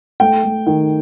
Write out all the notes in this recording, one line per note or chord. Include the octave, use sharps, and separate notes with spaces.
A3 G5
A3
D#3